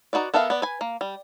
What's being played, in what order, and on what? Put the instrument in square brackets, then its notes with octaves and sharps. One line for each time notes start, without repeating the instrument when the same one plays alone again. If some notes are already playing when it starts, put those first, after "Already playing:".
[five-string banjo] D#4 F#4 B4 D5
B3 A4 A#4 E5 F5
B3 D5
B4 G#5
A#3
G3